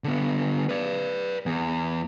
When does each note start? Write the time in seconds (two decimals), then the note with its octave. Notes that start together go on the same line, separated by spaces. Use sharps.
0.04 D3 B3
0.69 B4 D5
1.46 E2